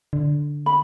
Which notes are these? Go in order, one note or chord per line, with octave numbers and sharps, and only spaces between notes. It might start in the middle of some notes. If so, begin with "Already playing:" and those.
D3
B5